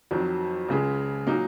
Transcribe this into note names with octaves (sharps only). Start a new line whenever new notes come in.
F2 D#3 F#3
C#2 C#3 G#3
A#2 F#3 A#3 D#4